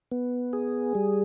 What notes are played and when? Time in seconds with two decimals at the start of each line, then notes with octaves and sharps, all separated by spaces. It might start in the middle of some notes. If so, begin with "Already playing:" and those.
0.12 B3
0.53 G#4
0.95 G3